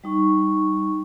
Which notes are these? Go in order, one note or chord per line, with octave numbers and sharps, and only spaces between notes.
G3 D#4 C#6